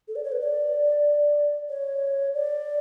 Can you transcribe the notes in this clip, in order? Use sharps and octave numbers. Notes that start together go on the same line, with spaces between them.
A4
D5
C#5
B4
D5
C#5
D5